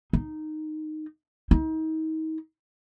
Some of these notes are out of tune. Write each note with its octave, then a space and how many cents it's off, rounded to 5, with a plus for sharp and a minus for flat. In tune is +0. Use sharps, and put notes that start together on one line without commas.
D#4 -10
D#4 +35